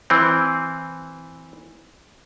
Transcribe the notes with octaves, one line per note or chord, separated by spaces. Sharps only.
E3 C4